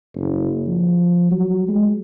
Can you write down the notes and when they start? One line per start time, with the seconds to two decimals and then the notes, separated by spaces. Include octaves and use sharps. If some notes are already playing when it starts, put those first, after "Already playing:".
0.14 F#1
0.67 F3
1.31 F#3
1.68 G#3